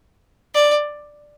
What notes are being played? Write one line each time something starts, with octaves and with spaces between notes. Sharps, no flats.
D5